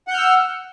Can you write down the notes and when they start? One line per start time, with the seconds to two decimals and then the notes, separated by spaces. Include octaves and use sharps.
0.07 F#5
0.11 G6
0.14 F6
0.17 E6